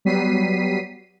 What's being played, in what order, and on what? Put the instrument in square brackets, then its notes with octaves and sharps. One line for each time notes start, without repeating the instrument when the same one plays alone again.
[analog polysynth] F#3 G3 B3 B6 C7 D#7